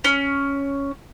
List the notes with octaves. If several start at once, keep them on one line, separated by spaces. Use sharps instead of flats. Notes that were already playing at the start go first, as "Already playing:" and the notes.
C#4